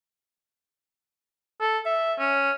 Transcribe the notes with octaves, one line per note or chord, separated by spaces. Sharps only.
A4
E5
C#4